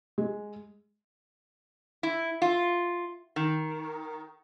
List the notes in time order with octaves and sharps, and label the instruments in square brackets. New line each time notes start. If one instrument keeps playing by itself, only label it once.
[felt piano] G#3
[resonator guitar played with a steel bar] E4
F4
D#3